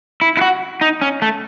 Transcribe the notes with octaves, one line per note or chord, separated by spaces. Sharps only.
E4
E4
F#4
D#4
C#4
A3